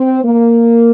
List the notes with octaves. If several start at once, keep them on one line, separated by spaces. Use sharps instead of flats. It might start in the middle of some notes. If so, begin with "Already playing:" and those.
Already playing: C4
A#3